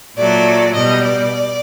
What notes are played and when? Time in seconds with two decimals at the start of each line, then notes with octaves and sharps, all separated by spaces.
0.16 A#2 F#3 A3 D5
0.74 B2 G3 D#5
1.04 D5